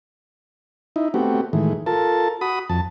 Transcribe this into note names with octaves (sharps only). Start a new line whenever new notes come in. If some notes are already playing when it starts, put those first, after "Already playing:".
D#4 E4
A3 B3 C4 F#4 G4
A2 D#3 E3 G#3
F4 A4 A#4 A5
F#4 B5 D#6
F2 A5